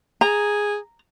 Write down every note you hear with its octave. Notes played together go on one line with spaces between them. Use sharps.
G#4 A#5